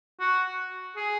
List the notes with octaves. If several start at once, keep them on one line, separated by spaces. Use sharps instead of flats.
F#4
G#4